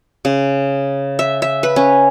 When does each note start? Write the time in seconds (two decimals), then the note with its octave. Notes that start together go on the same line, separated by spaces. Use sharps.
0.25 C#3
1.19 E5
1.42 E5
1.63 B4
1.76 C#4